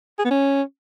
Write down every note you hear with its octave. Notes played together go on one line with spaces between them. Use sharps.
G#4
B3
C#4